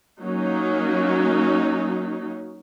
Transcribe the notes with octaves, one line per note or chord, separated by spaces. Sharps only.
F#3 A#3 C#4 D#4